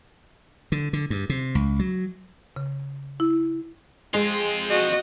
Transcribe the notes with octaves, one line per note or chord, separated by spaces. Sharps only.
D3
D3
G2
C3
C#2
F#3
C#3
E4
G#3 C4 F4
F#4 D#5